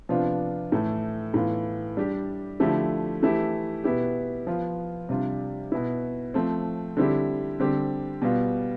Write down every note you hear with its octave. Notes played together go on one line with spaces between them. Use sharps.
C3 F3 B3 D4 F4
A2 E3 A3
A2 E3 B3 F4
G3 D4 G4
D3 F3 A3 E4 G4
E3 A3 E4 G4
B2 B3 E4 G4
F3 B3 F4
C3 G3 D4 F4
B2 B3 E4
F3 A3 C4
D3 G3 C4 E4 G4
D3 G3 C4 G4
B2 G3 B3 F4